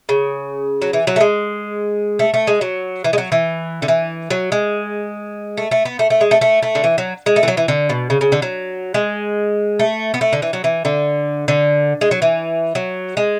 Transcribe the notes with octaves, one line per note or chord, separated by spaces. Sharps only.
C#3
F#3
E3
F#3
A3
G#3
A3
A3
G#3
F#3
E3
G#3
F#3
E3
D3
E3
F#3
G#3
A3
A3
B3
A3
A3
G#3
A3
A3
A3
D3
E3
F#3
G#3
A3
E3
F#3
E3
D3
B2
C#3
C#3
D3
F#3
G#3
A3
B3
A3
D3
E3
F#3
E3
D3
D3
G#3
F#3
E3
F#3
G#3